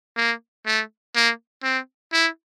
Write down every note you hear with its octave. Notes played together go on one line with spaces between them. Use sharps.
A#3
A3
A#3
C4
E4